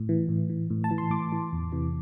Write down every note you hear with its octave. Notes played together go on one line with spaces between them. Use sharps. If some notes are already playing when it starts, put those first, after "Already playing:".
Already playing: A2
E3
A2
E3
A2
A5
E3
C6
A2 D6
E3
E2
C3 E3